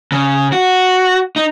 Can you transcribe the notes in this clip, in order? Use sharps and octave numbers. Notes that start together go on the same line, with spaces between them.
C#3
F#4
D#4